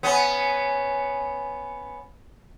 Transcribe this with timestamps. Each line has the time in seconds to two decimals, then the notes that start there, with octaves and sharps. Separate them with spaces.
0.03 B3 C#4